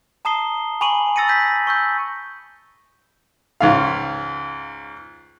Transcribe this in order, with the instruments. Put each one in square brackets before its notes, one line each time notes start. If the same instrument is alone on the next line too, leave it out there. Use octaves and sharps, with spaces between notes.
[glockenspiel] A5 A#5 D#6 C7 G7
G#5 B5 C#6 D6 D#7 F#7
B5 E6 A6 A#6 C#7 D#7
G6 B6
C#6 E6 G6
[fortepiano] C#2 G#2 F5